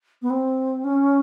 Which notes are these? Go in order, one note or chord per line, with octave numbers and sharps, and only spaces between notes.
B3
C4
C#4